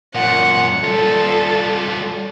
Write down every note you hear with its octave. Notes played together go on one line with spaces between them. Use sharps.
F#2 A#2 F#5
G3 F4 A4